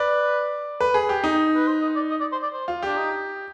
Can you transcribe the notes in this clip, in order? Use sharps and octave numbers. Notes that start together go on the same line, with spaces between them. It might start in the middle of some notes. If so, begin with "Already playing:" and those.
Already playing: B4 D5
B4
G#4
G4
D#4
B4
C5
D#5
D5
D#5
D5
C5
D5
C5
F4
D4 G4
D#4